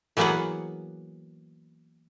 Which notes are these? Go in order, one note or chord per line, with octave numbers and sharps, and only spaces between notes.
E3 F#3 A#3 B3 G#4 F#5